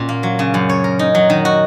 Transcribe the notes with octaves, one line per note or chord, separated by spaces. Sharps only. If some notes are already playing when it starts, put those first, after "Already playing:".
Already playing: A#2 C#4 F#4
A#3
F#3
C#3
F#2
C#5
A#4
D#4
F#3
D#3
F#4